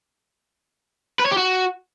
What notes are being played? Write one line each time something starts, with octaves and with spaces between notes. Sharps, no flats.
B4
C#5
G4
F#4